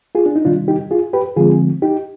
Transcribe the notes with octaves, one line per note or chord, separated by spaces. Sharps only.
F4 G#4
D4
D#4
C3 D#3 G3 D4 F4
D#4 G4
F4 G#4
G4 B4
D3 F3 G#3 C4 F4 G#4
D#4 G4